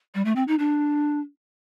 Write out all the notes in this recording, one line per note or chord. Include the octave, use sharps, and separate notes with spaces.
G3
A3
C4
D#4
D4